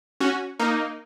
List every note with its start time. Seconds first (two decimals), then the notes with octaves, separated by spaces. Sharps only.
0.20 C#4 F#4
0.59 A#3 D#4